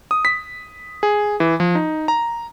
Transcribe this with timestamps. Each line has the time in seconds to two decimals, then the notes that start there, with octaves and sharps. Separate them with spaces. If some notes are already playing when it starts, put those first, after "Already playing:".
0.11 D#6
0.25 B6
1.03 G#4
1.40 E3
1.60 F3
1.75 D#4
2.08 A#5